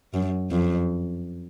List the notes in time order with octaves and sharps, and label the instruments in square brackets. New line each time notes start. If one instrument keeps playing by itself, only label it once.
[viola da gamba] F#2
F2